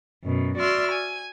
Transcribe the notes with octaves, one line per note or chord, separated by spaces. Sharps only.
F#2 B2
F#4 D5 E5 C6 F6
G#5